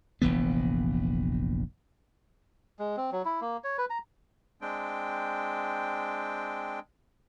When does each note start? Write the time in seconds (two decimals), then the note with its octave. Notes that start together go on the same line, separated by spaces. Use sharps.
0.22 F1 A#1 E3 B3
2.79 G#3
2.97 C4
3.12 F#3
3.25 E4
3.41 A#3
3.64 C#5
3.78 B4
3.90 A#5
4.61 G#3 C4 D4 G5